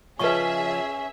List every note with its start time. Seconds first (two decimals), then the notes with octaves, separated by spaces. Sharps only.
0.19 C#3 F3 C#4 G#4 B4 D#5 E5 C#6